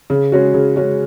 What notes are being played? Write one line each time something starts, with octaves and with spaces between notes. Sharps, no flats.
C#3
G#3 C#4 F#4
C#3
G#3 C#4 F#4